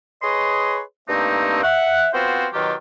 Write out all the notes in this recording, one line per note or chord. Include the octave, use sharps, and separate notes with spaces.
G#4 B4 C#5 D#5 C6
G2 A3 A#3 C4 D#4
E5 F#5
B3 C4 F4 F#4 C5
B2 D#3 F#3 F4 G4